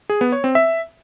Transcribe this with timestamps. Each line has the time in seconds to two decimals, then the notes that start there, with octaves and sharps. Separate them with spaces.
0.09 G#4
0.21 B3
0.32 C#5
0.44 C4
0.55 E5